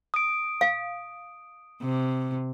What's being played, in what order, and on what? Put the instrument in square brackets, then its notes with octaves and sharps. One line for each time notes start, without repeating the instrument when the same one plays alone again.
[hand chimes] D#6 D7
[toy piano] F5
[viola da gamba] C3